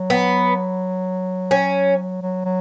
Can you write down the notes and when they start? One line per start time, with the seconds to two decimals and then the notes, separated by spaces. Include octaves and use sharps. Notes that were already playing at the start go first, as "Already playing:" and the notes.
Already playing: F#3
0.10 B3
1.51 C#4
2.22 F#3
2.45 F#3